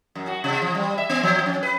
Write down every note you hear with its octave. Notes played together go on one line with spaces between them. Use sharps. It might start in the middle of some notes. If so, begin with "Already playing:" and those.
F#2
F#4
C3
F3
G3
E5
B3
F3
C#4
B4